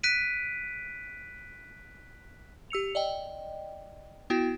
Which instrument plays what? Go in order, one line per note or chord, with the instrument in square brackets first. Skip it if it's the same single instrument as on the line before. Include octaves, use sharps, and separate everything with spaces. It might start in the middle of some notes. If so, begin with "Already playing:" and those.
[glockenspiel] F#6 B6 D7 D#7
[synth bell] G4 E6 C#7 F7
D5 D#5 G5
B3 E4 F#4 G5